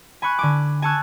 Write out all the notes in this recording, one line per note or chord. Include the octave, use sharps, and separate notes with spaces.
G#5 B5 C#6 F#6
D3 G#5 D6
G#5 A5 C#6 E6 F#6 G#6